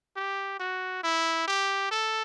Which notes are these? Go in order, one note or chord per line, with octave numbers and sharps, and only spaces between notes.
G4
F#4
E4
G4
A4